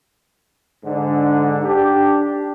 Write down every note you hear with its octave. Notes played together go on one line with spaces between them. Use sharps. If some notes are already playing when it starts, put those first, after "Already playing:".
G#2 D3
D4 G4